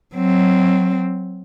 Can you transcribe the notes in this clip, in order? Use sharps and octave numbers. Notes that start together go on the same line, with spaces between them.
F#3 C4